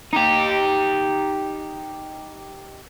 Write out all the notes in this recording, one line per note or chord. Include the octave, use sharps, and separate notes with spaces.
D#4 G4